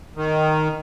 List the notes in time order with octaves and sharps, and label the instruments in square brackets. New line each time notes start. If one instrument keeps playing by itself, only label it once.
[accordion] D#3